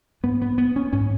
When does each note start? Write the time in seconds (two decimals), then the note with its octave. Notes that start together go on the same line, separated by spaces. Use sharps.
0.23 G#2 B3
0.42 B3
0.58 B3
0.76 C#4
0.93 G#2 C#4